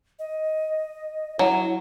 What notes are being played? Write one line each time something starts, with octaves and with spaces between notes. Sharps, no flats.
D#5
F#3 E4